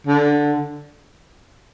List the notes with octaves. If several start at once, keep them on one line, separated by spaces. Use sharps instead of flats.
D3